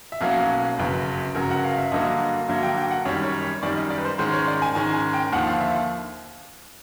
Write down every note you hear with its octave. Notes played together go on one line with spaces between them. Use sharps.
E5
B1 B2 F#3 A#3 C#4 F5
G1 F#2 C#3 F#3 B4
G1 F#2 C#3 F#3 A#4
F#5
F5
E5
G2 D3 F#3 A#3 D#5
G2 D3 F#3 A#3 E5
G5
G5
F#5
F#2 D#3 G3 C#5
C#5
C#5
F#2 D#3 G3 D5
D#5
D5
B4
C5
G#2 D#3 G#3 C#4 C5
C#5
D5
G#5
G#2 D#3 G#3 C#4 G#5
G#5
G5
D#2 D3 F3 F#5
F5
E5